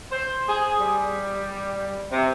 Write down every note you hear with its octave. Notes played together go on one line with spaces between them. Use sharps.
C5
G#4
G3
C3